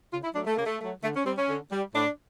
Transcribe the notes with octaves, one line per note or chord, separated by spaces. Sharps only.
C#3 F4
E4
F#3 A3 D4
A3
C#3 A#3
A3
F#3 A3
D3 A3
C#4
G3 C4
C#4
D3
G3
A2 D4